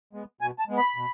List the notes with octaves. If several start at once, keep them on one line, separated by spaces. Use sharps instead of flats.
G#3 B3
B2 G#5
A5
G#3 B3
B5
B2